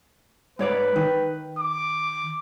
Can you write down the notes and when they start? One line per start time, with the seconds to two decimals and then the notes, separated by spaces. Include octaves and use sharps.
0.59 G#2 B4 C#5 D5
0.96 D#3
1.59 D6